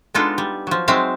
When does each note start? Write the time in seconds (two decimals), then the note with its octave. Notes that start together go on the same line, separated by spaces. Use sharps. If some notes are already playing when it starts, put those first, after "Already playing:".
0.14 G#3 B3 D4 D#4 F4 A4
0.38 G3
0.67 F3 F#3
0.88 F#3 G#3 C4 D#4 E5 F5